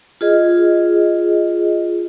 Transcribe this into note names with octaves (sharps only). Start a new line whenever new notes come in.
F4 G#4 D#5